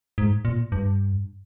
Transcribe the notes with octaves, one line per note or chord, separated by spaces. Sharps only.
G#2
A#2
G2